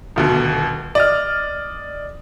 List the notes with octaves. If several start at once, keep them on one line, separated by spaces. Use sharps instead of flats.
D#1 D2 B2
D5 D#5 F6